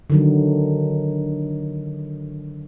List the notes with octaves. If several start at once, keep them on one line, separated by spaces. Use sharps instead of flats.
D3 D#3 F#3